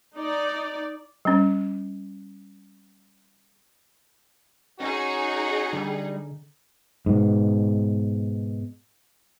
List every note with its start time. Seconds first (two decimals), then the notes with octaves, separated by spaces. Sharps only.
0.16 D#4 D5
1.25 G3 C#4
4.80 C#4 D#4 F#4 G#4
5.73 D3 G3
7.06 G#2 B2